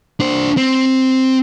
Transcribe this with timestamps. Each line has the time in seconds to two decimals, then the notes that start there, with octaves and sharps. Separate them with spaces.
0.20 D4 C5
0.57 C4